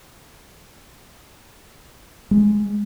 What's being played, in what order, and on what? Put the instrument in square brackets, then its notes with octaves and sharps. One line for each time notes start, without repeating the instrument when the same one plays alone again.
[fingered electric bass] G#3